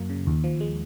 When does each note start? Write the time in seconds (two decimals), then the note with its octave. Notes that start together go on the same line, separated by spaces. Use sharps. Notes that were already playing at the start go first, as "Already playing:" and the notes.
Already playing: F#2 F#3 A#3
0.10 C#3
0.27 D#2
0.44 F3
0.61 G#3